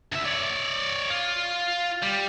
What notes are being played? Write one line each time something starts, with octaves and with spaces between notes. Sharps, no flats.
D2 E5
C#5 D5
F4
G3